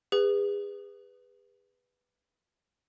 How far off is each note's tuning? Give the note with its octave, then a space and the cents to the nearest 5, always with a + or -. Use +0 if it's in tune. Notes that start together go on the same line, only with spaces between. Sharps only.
G#4 -35 B4 +0